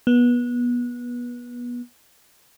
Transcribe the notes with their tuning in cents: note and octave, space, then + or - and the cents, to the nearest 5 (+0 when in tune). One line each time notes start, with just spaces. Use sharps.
B3 -25